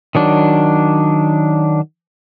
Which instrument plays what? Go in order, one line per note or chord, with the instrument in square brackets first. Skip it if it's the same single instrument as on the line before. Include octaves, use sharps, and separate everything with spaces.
[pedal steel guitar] D#3 F#3 D4